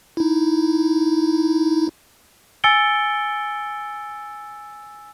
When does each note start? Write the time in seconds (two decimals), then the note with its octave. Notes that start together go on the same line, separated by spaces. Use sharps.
0.17 D#4 E4
2.64 G#5 E6 A6 C#7 D7 G7